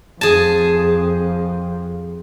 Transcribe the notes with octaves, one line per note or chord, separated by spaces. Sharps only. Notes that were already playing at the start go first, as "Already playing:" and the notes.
F2 G#4 A5